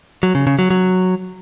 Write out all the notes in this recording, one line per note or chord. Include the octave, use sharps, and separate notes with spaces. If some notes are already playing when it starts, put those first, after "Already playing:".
F#3
C#3
C#3
F#3
F#3